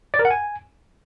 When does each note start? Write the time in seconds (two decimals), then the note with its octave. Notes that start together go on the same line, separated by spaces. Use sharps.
0.14 D5
0.19 A#4
0.25 F#5
0.31 G#5